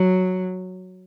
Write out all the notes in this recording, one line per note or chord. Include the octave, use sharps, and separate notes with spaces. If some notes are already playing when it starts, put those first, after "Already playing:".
Already playing: F#3